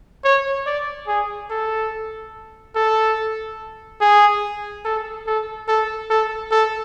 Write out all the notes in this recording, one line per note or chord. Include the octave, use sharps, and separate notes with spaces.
C#5
D5
G#4
A4
A4
G#4
A4
A4
A4
A4
A4